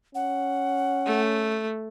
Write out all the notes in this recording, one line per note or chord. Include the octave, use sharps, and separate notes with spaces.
C#4 F#5
A3